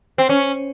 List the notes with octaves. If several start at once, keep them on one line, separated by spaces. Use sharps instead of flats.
C4
C#4